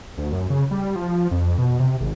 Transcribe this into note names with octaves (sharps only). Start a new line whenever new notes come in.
D2
F#2
C#3
G3
F3
F2
B2
C3
G#1